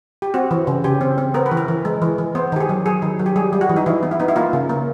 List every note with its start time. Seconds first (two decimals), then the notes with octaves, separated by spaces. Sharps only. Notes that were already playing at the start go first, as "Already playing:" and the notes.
0.22 G4
0.34 C4 F#4
0.51 E3
0.67 C#3
0.84 C#3 G4
1.01 C4
1.18 C4
1.34 B3 A#4
1.46 B4
1.51 E3
1.57 A#4
1.68 E3
1.85 G#3
2.02 E3
2.18 E3
2.35 B3 C5
2.52 D#3 G4
2.60 G#4
2.69 F#3
2.86 F#3 G#4
3.02 D#3
3.19 F#3
3.26 G4
3.36 G3 G#4
3.53 G3
3.61 F#4
3.69 E3
3.76 D#4
3.86 E3 E4
4.03 B3
4.11 E4
4.20 B3 D#4
4.28 E4
4.36 A#3 F4
4.53 C#3
4.69 A#3